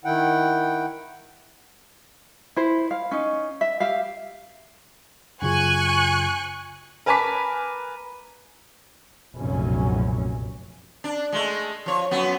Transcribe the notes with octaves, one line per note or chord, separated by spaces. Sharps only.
D#3 E4 F#5 G5
E4 C5
F5
C#4 D#4
E5
G4 E5 F5
F#2 C#3 F4 G#5 C#6 F#6
A#4 B4 G#5 A5 D6 B6
F1 B1 F#2 A#2 F#3 C#4
D4
G#3 A3
F3 C#5
F#2 F#3 B3